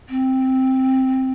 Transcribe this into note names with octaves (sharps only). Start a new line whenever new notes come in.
C4